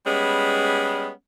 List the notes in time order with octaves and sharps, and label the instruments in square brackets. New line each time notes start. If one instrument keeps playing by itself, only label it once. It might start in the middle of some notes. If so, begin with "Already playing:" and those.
[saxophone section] G3 G#3 B3 C#4